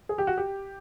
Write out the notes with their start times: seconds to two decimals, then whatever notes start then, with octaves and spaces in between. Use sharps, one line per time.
0.09 G#4
0.18 G4
0.27 F#4
0.38 G4